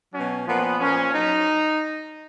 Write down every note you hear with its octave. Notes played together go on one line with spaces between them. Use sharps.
B2 F#3 C#4
A#2 F3 B3
A#2 F3 C#4
F#3 D#4